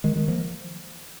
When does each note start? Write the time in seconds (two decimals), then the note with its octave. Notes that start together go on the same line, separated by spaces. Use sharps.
0.04 D#3 G#3
0.16 D#3 G#3
0.28 F3 A#3